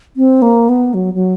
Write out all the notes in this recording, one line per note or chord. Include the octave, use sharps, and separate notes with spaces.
C4
A#3
B3
F#3
F#3